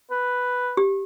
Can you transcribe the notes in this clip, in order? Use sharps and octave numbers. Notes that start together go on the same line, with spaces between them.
B4
G4